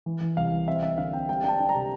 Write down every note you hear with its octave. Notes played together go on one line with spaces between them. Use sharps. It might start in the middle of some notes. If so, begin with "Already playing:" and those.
E3
E3
C2 F5
E3
C4 E5
C4 E5
D3 F5
C4 G5
G3 G5
D4 G5 A5
D4
A#5
C3